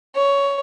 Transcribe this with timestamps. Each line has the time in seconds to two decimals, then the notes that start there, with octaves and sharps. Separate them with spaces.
0.16 C#5